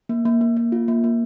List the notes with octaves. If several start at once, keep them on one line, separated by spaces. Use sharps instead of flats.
A#3
A#3
A#3
A#3
F4
A#3
A#3